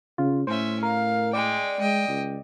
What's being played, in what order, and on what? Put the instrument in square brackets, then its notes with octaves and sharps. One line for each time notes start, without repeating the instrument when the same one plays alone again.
[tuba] C#3 [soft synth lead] F4
[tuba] A2 [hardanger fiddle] C#4 E5 [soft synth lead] C5
[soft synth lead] A#4 [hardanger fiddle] F5
[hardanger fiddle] G#3 G5 [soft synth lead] D5
[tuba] G#3 [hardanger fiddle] D#5 G5
[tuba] C#2